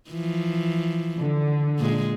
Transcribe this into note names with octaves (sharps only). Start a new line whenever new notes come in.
E3 F3
D3
A#2 G#3